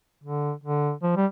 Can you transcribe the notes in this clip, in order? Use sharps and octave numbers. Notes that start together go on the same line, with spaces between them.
D3
D3
F3
G3